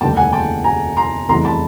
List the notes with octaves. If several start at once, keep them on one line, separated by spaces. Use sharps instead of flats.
F1 D#2 D3 G3 G5 A5
F#5 G#5
G5 A5
G#5 A#5
A#5 C6
F1 E2 C3 E3 G3 A#5 C6
A5 B5